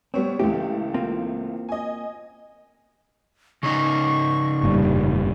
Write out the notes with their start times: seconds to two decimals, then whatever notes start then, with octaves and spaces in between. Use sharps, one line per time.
0.14 G3 B3 C4 C#5
0.39 C#2 E3 A3 G4
0.94 A#3 C4 F4
1.69 D#5 G#5
3.63 C#3 C#4 D#4 C#6
4.63 F1 G2 A#2 G3